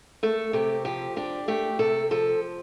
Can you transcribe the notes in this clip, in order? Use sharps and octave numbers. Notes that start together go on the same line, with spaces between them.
A3 A4
C3 G4
F3 G4
D4 G4
A3 G4
C3 A4
F3 A4